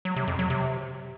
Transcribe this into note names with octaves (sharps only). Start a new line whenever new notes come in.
F#3
C3
F2
F#3
C3